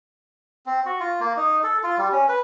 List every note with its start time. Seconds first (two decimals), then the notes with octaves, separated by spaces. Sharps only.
0.66 C4
0.86 F#4
1.00 F4
1.20 A#3
1.37 D#4
1.63 A4
1.83 F4
1.98 G3
2.12 C#4
2.28 B4